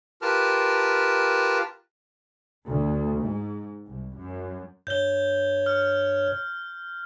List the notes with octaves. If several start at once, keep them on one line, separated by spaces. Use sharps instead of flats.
F4 G4 A#4 B4 A5 F6
D2
G#2
C2
F#2
G2 C#5 G6 G7
F6